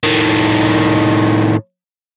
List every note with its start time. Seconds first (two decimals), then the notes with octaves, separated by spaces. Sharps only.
0.03 A2 D#3